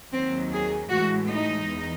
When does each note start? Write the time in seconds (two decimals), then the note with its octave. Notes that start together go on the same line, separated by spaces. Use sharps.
0.13 D#2 D#3 F#3 C4
0.52 G#4
0.89 A2 E3 G#3 F#4
1.29 D#4
1.66 E2